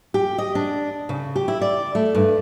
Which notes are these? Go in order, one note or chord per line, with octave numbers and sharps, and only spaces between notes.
G4
D#5
D4
C#3
G4
E4
D5
A3
G2